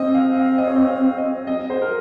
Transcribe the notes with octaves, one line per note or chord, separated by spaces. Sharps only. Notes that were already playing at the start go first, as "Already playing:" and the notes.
Already playing: C4 D#5
F5
F5
D#5
C#5
D#5
F5
D#5
D#5
C5
A#4